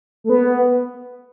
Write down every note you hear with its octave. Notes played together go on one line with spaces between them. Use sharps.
A3
B3